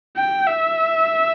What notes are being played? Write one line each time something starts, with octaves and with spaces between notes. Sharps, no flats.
G5
E5